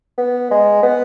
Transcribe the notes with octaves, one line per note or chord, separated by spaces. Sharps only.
B3
G#3
B3